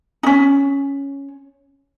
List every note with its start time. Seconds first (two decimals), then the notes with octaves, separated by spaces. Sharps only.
0.23 C#4 D#4